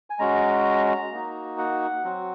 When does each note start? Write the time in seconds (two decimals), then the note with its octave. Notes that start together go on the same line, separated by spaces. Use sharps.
0.10 G#5
0.19 G#3 C#4 F#4 A#5
1.12 A#3 D#4 F#4
1.58 F#5
2.04 F#3 C4 F#4